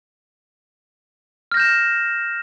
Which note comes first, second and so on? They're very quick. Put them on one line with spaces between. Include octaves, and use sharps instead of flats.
F6 A#6 G6 E7